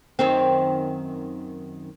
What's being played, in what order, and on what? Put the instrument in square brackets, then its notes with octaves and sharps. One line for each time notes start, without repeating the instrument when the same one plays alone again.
[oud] F#2 D#3 C4